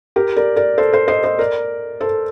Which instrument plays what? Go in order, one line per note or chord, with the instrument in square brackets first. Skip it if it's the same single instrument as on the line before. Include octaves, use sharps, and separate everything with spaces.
[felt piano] G4 A#4
A#4 D5
A#4 D5
A4 C5
A4 C5
C5 D#5
C5 D#5
A#4 D5
A4 C5